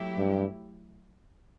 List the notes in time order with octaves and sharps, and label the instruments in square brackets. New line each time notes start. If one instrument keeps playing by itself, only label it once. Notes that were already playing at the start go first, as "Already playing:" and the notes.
Already playing: [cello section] F#3 A3 E4 G4
[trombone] G2